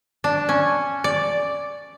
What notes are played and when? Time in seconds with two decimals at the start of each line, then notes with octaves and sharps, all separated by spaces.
0.24 D4
0.49 C#4
1.04 D5